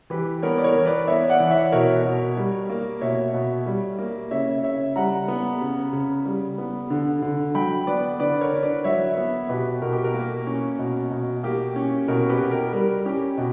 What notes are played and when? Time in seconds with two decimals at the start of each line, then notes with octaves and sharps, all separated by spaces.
0.10 E3 G4 B4
0.42 B3 A#4 C#5
0.58 D5
0.64 A#4 C#5
0.76 E3
0.86 B4 D5
1.07 B3 C#5 E5
1.29 D5 F#5
1.40 E3
1.50 C#5 E5
1.72 B2 A#4 C#5
2.05 B2
2.37 G3
2.70 A#3
3.01 B2 C#5 E5
3.34 B2
3.66 G3
3.99 A#3
4.31 C#3 C#5 E5
4.63 C#3 C#5 E5
4.96 G3 F#5 A#5
5.28 B3
5.61 C#3
5.93 C#3
6.26 G3
6.58 B3
6.90 D3
7.22 D3
7.55 F#3 G5 B5
7.87 B3 B4 D5
8.20 D3 B4 D5
8.41 A#4 C#5
8.52 D3
8.63 B4 D5
8.84 F#3 C#5 E5
9.17 B3
9.49 B2 G4 B4
9.82 B2 A#4
9.93 G4
10.04 A#4
10.14 A#3
10.47 C#4
10.79 B2
11.11 B2
11.43 A#3 G4
11.76 C#4
12.08 B2 A#4
12.29 G4 B4
12.41 B2
12.51 A#4
12.72 G3 A#4
13.06 C#4 G4
13.38 B2